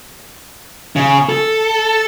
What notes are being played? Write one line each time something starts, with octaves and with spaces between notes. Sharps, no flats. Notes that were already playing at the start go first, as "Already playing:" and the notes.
C#3
A4